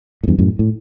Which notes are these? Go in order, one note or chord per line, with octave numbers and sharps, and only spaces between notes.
A2
E2 G2
F#2 A2
A2